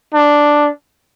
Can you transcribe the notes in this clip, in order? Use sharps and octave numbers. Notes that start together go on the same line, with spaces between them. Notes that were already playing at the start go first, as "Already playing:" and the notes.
D4